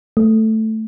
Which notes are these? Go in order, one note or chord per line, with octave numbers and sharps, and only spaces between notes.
A3